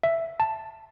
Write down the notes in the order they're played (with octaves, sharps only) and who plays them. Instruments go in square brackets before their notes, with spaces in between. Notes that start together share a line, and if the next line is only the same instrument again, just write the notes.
[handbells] E5
A5